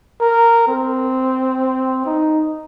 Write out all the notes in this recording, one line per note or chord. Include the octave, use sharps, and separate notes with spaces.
A#4
C4
D#4